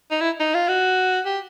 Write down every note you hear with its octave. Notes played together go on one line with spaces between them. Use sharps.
D#4
E4
D#4
F4
F#4
G4